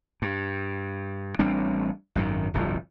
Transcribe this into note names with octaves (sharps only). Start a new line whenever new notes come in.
G2
A1 G3 C4 D4
G#1 F#2 D#3
D1 G1 C2 F3